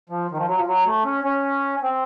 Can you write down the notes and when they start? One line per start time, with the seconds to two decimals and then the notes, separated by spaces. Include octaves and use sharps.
0.09 F3
0.31 D#3
0.37 F3
0.47 F#3
0.57 F3
0.67 F#3
0.86 A3
1.05 C#4
1.24 C#4
1.82 C4